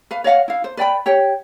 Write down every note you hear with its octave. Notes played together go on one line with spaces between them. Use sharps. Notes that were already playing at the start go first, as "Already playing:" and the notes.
B4 F5
C#5 D#5 F5 F#5
E4 F5
C5
B4 D5 G5 B5
G4 C#5 G5